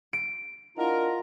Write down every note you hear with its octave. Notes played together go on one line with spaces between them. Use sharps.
D7
D4 E4 F4 A#4 D#5 F#5 A#5